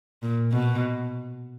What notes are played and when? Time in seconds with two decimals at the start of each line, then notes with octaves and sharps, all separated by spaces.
0.23 A#2
0.52 B2